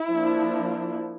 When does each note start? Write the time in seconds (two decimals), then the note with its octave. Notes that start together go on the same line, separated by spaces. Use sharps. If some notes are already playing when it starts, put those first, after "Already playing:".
Already playing: E4
0.09 F3 A#3 D4